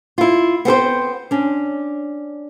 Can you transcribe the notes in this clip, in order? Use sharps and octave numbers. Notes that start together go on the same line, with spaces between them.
E4 F4
B3 C4 A4 C5
C#4 D4